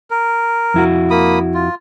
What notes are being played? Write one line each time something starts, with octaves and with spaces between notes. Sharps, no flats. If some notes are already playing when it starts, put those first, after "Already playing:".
A#4
F2 E4 F#4
A#3 B5 D#6
F4